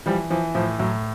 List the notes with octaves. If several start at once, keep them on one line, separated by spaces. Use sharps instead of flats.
E3 F3 G3
E3 F3
A2 F3
A2 F#3